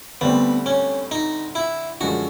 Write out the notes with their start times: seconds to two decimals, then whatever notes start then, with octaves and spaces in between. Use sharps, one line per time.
0.21 D2 D3 G3 B3 C4
0.66 C#4
1.11 D#4
1.55 E4
2.01 F#2 D3 F3 G#3 F#4